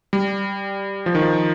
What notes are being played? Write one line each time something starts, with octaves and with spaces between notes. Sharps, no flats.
G3
F3
D#3
F3